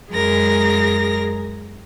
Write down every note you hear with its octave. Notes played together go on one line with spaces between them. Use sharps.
F#2 G#3 G#4 A#4 A#6